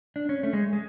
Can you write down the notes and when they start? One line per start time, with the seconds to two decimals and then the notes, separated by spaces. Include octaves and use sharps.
0.16 D4
0.29 C#4
0.43 A3
0.53 G#3
0.73 G#3